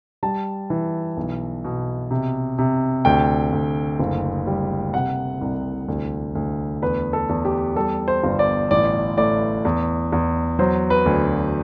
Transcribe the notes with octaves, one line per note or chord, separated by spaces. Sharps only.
G3 A5
E3
B1
B2
C3
C3
D2 G5
D2
F#1
G3
C3 F#5
C2
D2
D2
E2 B4
A4
E2
G4
G3 A4
C5
G1
D5
A1 D5
A2 D5
E2
E2
F#3 C5
B4
D2